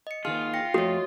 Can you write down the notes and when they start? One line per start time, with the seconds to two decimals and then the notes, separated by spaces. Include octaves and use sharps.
0.07 D#5 C#7
0.25 D#2 D#3 F4 G#4 F6
0.54 G5 A#6 C#7
0.74 F2 A3 F#4 C#5 D#5 D#6